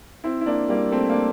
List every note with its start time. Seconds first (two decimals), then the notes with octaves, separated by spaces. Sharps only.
0.24 C4 E4
0.41 E4
0.46 A#3 D4
0.69 G3 A#3
0.91 A3 C4
1.09 A#3 D4